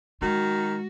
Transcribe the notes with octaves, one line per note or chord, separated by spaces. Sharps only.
D#3 G#3 F#4